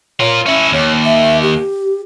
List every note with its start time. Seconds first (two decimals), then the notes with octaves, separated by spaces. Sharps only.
0.20 F4 A#4 C#5
0.46 C#4 E4 E5
0.72 D#2 C#5
1.05 E5
1.42 G4